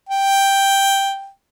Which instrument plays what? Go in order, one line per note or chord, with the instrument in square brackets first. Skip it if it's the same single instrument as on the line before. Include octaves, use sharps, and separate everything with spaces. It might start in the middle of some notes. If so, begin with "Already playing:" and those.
[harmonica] G5